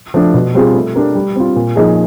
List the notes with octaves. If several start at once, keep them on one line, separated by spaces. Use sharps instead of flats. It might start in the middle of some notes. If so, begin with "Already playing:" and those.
F3 A3 D4
B2
G3 C4 F4 G#4
A3
D4 G4 A#4
G3
C4 F4
A#2
F3 A#3 D#4 G#4